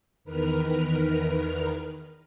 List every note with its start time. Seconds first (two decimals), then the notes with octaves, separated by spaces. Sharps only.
0.24 E2 D#3 A#4 B4 F6